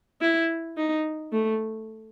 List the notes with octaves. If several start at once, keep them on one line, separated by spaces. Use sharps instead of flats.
E4
D#4
A3